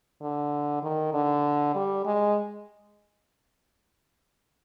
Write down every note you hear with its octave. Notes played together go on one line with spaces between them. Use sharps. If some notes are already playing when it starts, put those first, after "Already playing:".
D3
D#3
D3
G3
G#3